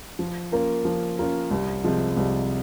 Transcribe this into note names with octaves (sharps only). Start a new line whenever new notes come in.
F3
A#3 C#4 F4 A#4
F3
A#3 C#4 F4 A#4
C2
C3 F3 G#3
C2